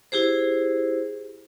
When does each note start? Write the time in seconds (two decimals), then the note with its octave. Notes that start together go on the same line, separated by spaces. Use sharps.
0.12 E4 G4 G#4 C5